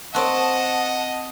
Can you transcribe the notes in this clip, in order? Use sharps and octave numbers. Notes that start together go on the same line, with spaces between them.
C4 F#4 D#5 F#5 A5